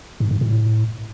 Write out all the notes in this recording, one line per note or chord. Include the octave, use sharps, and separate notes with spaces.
G#2
G#2
A2